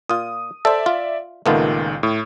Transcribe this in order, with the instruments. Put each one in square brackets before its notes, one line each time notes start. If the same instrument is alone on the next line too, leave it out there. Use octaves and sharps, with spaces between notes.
[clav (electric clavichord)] A#2 F4 [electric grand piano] D#6
[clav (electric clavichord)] A4 C5 [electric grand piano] D5 E5
[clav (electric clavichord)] F4
[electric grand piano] C#2 A#2 D#3 [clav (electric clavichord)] A3 B3 F4
[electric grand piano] A2